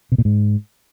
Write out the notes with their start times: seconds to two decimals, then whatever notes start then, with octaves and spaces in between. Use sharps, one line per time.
0.12 B2
0.18 A#2
0.25 G#2